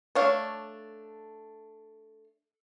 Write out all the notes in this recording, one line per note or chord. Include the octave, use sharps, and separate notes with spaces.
A3 D4 C#5 F5